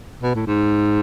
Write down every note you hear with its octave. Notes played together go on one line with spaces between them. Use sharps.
B2
A2
G#2